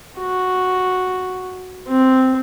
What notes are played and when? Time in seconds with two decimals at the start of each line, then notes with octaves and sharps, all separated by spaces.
0.19 F#4
1.88 C4